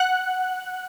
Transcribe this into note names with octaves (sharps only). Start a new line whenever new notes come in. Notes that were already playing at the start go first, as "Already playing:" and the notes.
Already playing: F#5 F#6